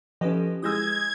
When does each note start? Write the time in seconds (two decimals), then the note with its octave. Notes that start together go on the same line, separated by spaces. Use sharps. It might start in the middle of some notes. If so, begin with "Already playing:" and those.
0.21 F3 C#4 G4 A4 B4 D#5
0.62 E3 G#3 D#6 E6 G6 G#6 A#6